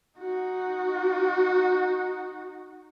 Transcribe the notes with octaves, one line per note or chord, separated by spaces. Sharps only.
D#4 F#4